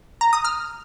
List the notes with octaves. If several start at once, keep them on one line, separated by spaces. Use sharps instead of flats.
A#5
D#6
F6